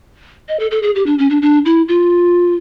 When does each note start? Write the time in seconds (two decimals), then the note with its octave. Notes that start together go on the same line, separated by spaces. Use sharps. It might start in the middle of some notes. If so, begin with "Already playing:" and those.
0.48 D#5
0.60 A4
0.71 A4
0.83 G#4
0.95 G4
1.06 D4
1.19 C#4
1.30 D4
1.42 D4
1.65 E4
1.88 F4